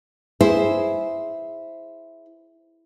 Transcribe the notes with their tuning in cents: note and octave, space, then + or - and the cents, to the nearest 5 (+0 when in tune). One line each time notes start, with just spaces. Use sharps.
E4 +0 G#4 +0 C5 +0